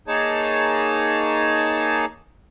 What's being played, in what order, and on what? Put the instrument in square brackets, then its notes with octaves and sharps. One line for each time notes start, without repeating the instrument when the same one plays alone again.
[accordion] A#3 D#4 G#4 C#5 A5